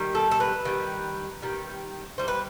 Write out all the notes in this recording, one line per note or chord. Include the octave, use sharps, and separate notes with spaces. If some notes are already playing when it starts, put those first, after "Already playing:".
Already playing: D#3 G3
A4
A4
B4
D#3 G3
D#3 G3
D#3 G3 C5
B4